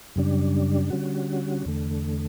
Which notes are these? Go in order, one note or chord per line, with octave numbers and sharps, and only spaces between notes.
F#2 C#3 G3 D4
D3 G3 C#4 F#4
E2 D3 A3